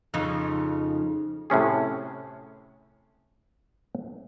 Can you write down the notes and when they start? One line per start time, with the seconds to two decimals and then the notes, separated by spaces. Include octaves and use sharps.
0.14 F2 C#3 D#4
1.50 A2 C3 C#4 G#4